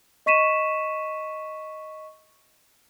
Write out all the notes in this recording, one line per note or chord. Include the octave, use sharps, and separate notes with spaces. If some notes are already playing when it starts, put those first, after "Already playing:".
D#5 C#6 B6 D#7 E7